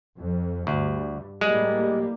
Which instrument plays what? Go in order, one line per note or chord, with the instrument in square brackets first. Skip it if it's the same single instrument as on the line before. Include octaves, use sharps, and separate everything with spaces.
[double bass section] F2
[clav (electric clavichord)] D2 [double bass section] G2
[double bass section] A2 G3 A#3 [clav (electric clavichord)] G#3